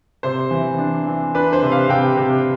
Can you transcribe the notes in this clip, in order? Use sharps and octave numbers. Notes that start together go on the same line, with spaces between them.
C3 C5
E3
D4
E3
D4 B4
C5
C3
F5
C3 G5
C3